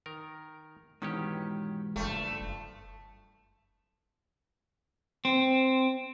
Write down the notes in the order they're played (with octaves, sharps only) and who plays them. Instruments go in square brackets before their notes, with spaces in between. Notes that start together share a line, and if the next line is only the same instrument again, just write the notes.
[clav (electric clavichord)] D#3 A#4
[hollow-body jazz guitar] G#2 B2 E3 [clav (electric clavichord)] D#3 C#4 G4
[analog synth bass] F#1 [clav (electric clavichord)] G2 F3 [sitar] A3
[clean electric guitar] C4